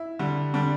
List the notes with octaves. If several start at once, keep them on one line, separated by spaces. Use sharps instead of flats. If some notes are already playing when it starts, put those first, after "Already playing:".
Already playing: E4
D3 G3
D3 G3 D4